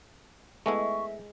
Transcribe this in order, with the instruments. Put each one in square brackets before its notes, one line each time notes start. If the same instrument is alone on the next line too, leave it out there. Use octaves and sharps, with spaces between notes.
[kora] G#3 [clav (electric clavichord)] A3 B3 E4 [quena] E5 [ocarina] C#6